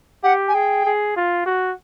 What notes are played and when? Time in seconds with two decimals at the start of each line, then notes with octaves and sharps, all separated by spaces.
0.24 G4 F#5
0.48 G#5
0.54 G#4 G5
0.86 G#4
1.16 F4
1.46 F#4